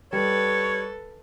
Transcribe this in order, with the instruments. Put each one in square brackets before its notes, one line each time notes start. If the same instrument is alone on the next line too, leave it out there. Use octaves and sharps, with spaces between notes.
[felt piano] G3 [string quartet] A4 B4 [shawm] C#5